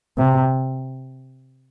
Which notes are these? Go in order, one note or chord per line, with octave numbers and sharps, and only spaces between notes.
C3